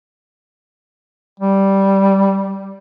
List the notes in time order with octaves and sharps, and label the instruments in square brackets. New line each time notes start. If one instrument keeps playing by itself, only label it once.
[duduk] G3